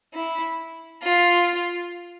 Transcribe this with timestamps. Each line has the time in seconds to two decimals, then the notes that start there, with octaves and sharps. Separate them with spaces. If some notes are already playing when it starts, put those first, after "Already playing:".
0.14 E4
1.03 F4